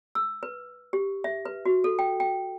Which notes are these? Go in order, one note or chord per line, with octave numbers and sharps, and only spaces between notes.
E6
B4
G4
E5
B4
F#4
A4
G5
G5